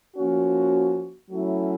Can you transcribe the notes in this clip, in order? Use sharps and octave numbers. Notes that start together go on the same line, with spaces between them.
F3 A#3 C#4 F#4
F#3 A3 C#4 E4